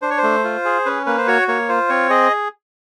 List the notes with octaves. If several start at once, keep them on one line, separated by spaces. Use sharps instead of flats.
D4 C5
C#5
C5
A3
F4
G#4
C#4 B4
A#3 B4
C5
F#4 C#5
A#3 C#5
F4 C5
C4 C#5
G#4 D#5